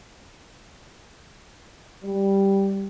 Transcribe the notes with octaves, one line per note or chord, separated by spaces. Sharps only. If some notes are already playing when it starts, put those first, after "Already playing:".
G3